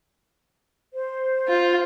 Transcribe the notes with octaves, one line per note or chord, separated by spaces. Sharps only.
C5
F4